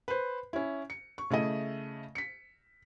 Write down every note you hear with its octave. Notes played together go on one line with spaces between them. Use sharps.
B4 C5
C#4 E4
C#7
C#6
C#3 A3 E4 D#5
B6 C#7